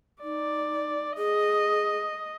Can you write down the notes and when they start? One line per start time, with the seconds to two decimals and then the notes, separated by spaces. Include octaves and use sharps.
0.23 D#4 D5
1.18 G#4 D#5